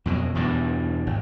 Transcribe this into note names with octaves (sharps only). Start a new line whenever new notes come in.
F2 B2 F#3
E2 G2 B2
G#1